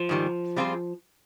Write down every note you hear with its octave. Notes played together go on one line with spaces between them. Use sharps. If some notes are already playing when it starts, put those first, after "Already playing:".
Already playing: F3
G#2 D#3 G3
G3 C4 F4 G#4 C5